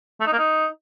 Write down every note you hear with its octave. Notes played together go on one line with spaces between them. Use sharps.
A3
D#4
A#3
D#4